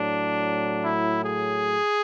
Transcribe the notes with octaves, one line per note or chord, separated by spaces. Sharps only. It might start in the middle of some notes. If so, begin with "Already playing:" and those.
Already playing: A2 F#3 D4
E4
G#4